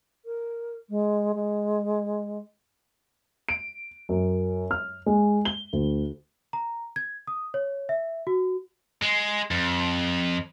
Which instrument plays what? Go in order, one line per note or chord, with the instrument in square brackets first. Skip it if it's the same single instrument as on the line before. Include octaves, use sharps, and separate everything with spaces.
[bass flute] A#4
G#3
G#3
[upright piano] D7
F#2
F6
G#3
G7
D2
[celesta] A#5
G#6
D#6
C#5
E5
F#4
[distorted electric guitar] G#3
F2